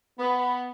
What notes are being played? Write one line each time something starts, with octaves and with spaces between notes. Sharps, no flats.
B3